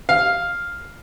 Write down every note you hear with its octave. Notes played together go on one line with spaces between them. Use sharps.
F5